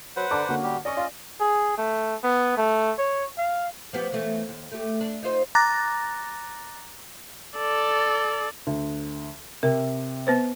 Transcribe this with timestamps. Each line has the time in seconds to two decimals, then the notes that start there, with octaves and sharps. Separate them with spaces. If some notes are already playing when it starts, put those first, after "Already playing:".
0.16 F#3 B4 C5 F#5
0.31 D3 A5 A#5 D6
0.49 D3 A#3 C#4 F#4
0.63 G3 G4
0.85 C#4 D5 D#5 C#6
0.97 F4 D5
1.40 G#4
1.78 A3
2.24 B3
2.57 A3
2.99 C#5
3.37 F5
3.93 F3 B3 G4
4.12 E3 A3 B3
4.49 D#2
4.71 A3 G4
5.01 D4
5.23 D#4 F4 C5
5.55 A#5 D6 F#6 A6 A#6
7.57 A4 D5
8.67 D2
9.63 C3 A#4
10.27 B3 B4 C5